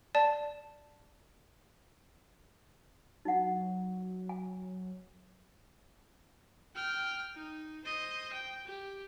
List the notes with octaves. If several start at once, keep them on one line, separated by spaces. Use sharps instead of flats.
D5 A5
F#3 D#4 F#5
G#5
G5 F6
D#4
C5 D#5
G5
G4